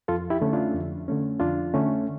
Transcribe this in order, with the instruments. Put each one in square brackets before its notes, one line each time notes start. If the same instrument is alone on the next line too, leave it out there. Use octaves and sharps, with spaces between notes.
[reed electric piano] F2 F4 A4
E4 G4
D3 A3 C#4
D4 F4
F2
D3 A3 C#4
F2 D4 F4
D3 A3 C#4